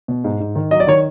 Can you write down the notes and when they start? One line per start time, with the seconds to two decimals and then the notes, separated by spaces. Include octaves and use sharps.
0.08 B2
0.24 G#2
0.40 G#2
0.55 D#3
0.71 F#3 D#5
0.80 D5
0.87 D#3 C#5